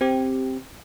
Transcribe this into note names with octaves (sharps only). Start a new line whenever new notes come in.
C4 G4